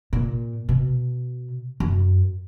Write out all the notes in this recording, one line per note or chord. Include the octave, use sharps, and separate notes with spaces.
A#2
B2
F#2